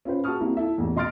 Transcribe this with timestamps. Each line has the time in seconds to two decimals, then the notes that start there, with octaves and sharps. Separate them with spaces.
0.05 C#4 F4 B4 C5
0.24 F#4 G#4 A5 C#6 D#6 F6
0.40 G3 A#3 C4 E4 F#4
0.57 E4 A4 E5
0.78 A1 E2
0.96 B2 D#5 C6 F6 A6 D7